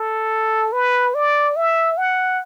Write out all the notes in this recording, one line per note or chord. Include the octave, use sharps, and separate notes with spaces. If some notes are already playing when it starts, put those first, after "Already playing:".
Already playing: A4
B4
D5
E5
F#5